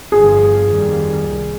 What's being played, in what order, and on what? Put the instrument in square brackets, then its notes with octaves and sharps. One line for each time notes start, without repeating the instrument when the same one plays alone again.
[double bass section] G1 G2 F3 [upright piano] G#4
[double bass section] F2 D#3 G3 A#3
C2 C3